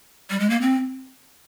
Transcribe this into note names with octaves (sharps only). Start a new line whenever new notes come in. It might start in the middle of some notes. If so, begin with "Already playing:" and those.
G3
G#3
A#3
C4